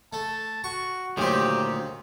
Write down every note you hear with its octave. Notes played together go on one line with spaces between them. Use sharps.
A3 A5
F#4 C#6
D2 A#2 D#3 F#3 C4 G4